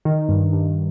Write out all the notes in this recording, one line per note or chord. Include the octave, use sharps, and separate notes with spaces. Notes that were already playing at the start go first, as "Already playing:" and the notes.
D#3
G2
G2